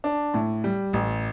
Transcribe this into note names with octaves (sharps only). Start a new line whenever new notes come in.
D4
A2
G3
A1